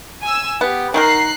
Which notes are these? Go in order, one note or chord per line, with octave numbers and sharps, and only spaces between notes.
G#5 E6
B3 G4
D#3 D#4 A#4 F#5 F#6 C7